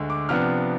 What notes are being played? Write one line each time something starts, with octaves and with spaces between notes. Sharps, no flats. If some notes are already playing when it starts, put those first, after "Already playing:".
Already playing: D2 D3 G#3
D6
C3 F3 B3 D4 F6